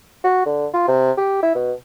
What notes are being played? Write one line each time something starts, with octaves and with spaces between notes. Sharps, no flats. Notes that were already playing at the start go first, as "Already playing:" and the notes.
F#4
D3
F4
C3
G4
E4
B2